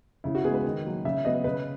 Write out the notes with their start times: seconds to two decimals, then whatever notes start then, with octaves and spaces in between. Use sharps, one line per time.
0.24 C#3 E4
0.35 F#4
0.44 G#3 B3 G#4
0.54 B4
0.64 D#3
0.84 F#3 A#3
1.05 C#3 E5
1.25 F#3 B3 D#5
1.44 C#3 B4